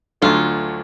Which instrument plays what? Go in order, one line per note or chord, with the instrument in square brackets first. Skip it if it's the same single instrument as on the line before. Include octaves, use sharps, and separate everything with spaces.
[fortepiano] D2 D3 F#3 A3 [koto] F4